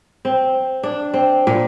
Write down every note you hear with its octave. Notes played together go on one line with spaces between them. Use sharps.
C4
D4
C4
A#2